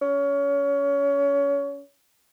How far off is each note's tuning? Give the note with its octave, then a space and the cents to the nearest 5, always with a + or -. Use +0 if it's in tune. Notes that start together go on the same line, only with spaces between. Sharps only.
C#4 +25